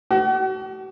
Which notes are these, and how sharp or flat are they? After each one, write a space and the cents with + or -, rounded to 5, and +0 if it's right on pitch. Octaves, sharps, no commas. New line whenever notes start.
F#4 +40